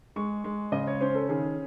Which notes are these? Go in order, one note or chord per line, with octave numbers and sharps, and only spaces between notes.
G#3 C#6
G#3
C#3 D#5
C#5
C#4 C5
A4
D#3 G#4